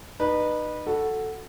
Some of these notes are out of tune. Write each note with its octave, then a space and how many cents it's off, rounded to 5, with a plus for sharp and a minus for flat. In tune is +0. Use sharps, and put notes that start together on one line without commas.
D#4 -35 B4 -15
F#4 +0 A4 +0